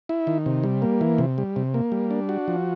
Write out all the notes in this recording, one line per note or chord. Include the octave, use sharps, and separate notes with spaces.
E4
D#3
C3
G3
A#3
E3
C3
G3
C3
A#3
G3
D4
F#4
F3